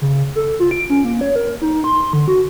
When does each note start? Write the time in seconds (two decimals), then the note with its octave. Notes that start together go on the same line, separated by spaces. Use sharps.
0.01 C#3
0.36 A4
0.60 F4
0.71 D7
0.90 C#4
1.04 A#3
1.21 C#5
1.36 A#4
1.62 D#4
1.84 C6
2.13 D3
2.28 F#4